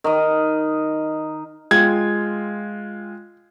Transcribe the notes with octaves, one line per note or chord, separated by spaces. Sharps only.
D#3 D#5
G#3 F4 G5 G#6